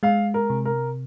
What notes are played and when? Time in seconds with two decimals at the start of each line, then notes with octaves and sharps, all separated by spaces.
0.03 G#3 F5
0.34 A#4
0.50 C3
0.65 A#4